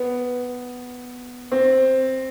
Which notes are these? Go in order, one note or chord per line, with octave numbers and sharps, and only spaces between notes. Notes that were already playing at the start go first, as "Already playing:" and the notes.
Already playing: B3
C4